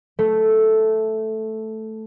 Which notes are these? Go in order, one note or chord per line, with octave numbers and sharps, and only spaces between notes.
A3